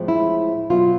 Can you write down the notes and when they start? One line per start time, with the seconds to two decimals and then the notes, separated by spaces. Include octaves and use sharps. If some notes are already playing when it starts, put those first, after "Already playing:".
Already playing: A2 F3 G#3 C4
0.08 E4
0.70 B2 F#3 B3 F4